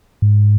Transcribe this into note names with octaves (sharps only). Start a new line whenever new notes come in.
G#2